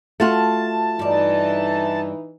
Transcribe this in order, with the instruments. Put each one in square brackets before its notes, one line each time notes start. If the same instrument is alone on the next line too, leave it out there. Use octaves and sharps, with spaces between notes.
[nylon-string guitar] A3 F4 F#4 [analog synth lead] A5
[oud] G2 D5 [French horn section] E3 D#4